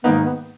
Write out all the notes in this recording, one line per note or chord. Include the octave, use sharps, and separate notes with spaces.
G#2 D#3 A#3 B3 D#4
B3